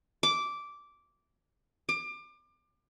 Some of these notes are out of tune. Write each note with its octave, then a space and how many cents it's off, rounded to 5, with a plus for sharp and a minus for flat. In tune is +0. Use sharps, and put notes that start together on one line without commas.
D6 -10
D6 +30